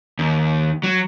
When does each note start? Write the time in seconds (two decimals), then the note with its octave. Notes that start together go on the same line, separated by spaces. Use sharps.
0.19 D#2
0.83 F#3